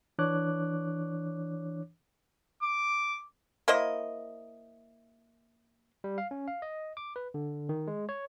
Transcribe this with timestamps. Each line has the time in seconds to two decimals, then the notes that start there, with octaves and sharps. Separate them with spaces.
0.19 E3 D4 C#5 D6 F#6
2.63 D6
3.68 A#3 E4 C5 D#5
6.04 G3
6.18 F5
6.31 C#4
6.48 F5
6.62 D#5
6.97 D6
7.16 B4
7.34 D3
7.69 D#3
7.87 G#3
8.09 C#5